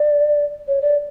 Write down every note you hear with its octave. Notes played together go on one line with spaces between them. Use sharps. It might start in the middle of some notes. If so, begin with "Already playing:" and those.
Already playing: D5
C#5
D5